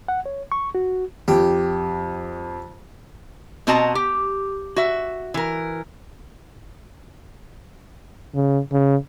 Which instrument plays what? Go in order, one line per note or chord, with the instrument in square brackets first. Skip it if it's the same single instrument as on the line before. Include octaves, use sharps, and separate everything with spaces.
[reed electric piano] F#5
C#5
C#6
F#4
[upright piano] F2 [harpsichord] G4
[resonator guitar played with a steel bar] B2 C4 F#4 D#5 A5 A#5
G4
F#4 E5
E3 A#4
[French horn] C#3
C#3